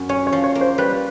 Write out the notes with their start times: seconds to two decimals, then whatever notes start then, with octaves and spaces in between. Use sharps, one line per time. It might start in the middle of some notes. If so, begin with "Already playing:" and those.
Already playing: F#2
0.09 C#4 C#5
0.27 C#5
0.32 F3
0.44 C#5
0.55 A#3
0.61 C5
0.78 G3 B4